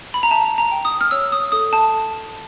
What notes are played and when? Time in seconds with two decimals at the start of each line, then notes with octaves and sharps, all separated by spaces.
0.14 B5
0.23 A#5
0.31 E5 A5
0.58 A#5
0.71 G5
0.85 D#6
1.01 F6
1.11 C#5 E6
1.32 D#6
1.52 A4 D#6
1.73 A5